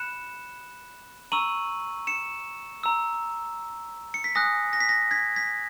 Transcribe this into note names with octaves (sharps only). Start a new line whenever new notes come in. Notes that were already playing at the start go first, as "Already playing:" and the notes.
Already playing: B5 F#6 C#7 E7
A#5 C#6 E6 D#7 F#7
C#7 E7
A#5 E6
C#7
B6
G#5 D#6 F#6 A#6
A#6
B6
A#6
G#6 B6
G#6 B6